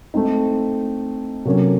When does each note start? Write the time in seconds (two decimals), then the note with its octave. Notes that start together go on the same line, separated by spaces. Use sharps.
0.14 A3 C4 D#4
1.45 C3 F#3 A#3 C#4 A4